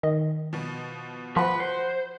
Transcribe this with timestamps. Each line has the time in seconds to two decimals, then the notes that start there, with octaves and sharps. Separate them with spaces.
0.03 D#3 D#5
0.53 B2 F3
1.36 F3 F#4 B4 F#5 C6
1.61 C5